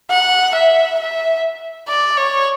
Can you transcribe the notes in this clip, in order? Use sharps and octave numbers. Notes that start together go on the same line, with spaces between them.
F#5
E5
E5
D5
C#5